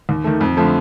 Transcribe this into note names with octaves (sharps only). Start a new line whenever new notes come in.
D#2
D#3 A3
F2
D3 F3 A3